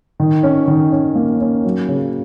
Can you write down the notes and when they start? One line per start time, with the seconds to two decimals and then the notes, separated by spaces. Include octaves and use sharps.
0.20 D#3
0.43 C#4
0.67 D#3
0.92 C#4
1.15 A#3
1.41 C#4
1.65 F#3
1.88 C#3